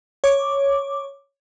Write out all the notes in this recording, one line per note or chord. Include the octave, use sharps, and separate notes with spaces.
C#5 D6